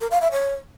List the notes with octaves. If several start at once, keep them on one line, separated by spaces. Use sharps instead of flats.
A#4
F5
E5
C#5